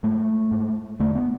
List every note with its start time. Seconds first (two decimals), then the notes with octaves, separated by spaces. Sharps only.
0.03 G#2 A3
0.51 G#2
1.00 E2 D3 A3
1.15 B3